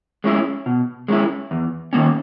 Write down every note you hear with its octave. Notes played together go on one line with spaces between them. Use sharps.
G#3 C#4 E4
B2
G#3 C#4 E4
E2
D#3 A#3 C#4